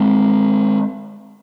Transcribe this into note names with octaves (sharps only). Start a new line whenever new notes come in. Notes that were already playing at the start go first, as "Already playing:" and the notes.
Already playing: G#3 C4